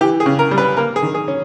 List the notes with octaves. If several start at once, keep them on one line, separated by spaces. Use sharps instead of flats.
E3 G4
G#4
C#3
A#4
G3
B4
A#3 A#4
G#4
D#3
G#4
C#4